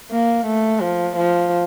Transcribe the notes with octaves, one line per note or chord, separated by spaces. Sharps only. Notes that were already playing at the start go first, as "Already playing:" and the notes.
A#3
A3
F3
F3